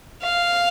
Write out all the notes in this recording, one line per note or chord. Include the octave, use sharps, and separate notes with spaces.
F5